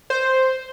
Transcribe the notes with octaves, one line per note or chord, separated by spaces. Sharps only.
C5